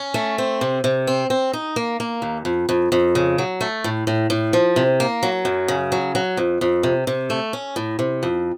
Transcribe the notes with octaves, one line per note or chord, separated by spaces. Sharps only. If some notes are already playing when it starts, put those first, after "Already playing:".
Already playing: C#4
A3
C4
C3
C3
C4
C4
D#4
A#3
A#3
D#2
F2
F2
F2
C#3
F#3
A3
A2
A2
A2
F3
C3
A#3
F#3
F#2
C#3
F#3
F#3
F2
F2
C3
C3
A3
C#4
A2
C3
F2